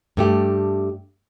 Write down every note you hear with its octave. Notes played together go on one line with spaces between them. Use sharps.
G2 A3 G4